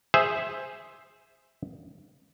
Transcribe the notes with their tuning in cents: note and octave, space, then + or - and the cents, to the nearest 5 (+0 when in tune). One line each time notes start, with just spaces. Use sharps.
G#4 +0 C5 +0 E5 +0